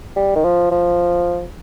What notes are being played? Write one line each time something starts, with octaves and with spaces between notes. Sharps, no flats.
G3
D#3
F3
F3